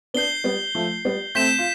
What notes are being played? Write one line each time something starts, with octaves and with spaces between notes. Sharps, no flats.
B3 D4 G6 C7 G7
G3 B3
F3 A3
G3 B3
A3 C4 G6 B6 E7
F4